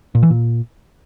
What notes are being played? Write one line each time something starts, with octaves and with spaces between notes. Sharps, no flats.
A#2
E3
A#2